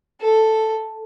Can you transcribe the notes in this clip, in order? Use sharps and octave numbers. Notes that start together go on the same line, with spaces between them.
A4